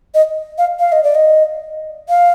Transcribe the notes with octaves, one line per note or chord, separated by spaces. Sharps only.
D#5
F5
F5
D#5
D5
D#5
F5